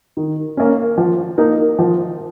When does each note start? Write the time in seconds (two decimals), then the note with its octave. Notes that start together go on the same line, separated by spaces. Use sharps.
0.17 D#3
0.57 A#3 C#4
0.98 F3
1.38 A#3 D#4 A#4
1.79 F3